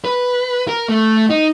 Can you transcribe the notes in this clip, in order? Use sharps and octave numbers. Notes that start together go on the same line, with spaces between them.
B4
A#4
A3
D#4